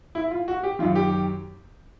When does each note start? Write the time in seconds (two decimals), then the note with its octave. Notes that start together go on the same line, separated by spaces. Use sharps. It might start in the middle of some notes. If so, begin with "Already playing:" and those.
0.15 E4
0.31 F4
0.48 F#4
0.63 G4
0.79 F#2 D#3 F4
0.95 G4